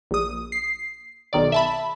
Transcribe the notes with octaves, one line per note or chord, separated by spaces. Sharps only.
A#1 D#6
C7
B1 D#3 D5
E5 A5 B5